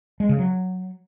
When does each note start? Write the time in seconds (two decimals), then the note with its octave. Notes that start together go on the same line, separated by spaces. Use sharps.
0.20 G#3
0.29 C#3
0.39 F#3